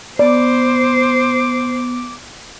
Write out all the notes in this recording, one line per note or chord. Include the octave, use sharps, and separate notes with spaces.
B3 C5 D5 D6